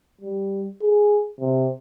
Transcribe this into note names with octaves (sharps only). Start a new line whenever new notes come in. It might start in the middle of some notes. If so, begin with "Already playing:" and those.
G3
G#4
C3